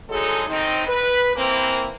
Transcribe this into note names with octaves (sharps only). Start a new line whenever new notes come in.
D3 F#3 G#3 D#4 G#4 A4
D#3 C4 D#4
B4
E3 A#3 C4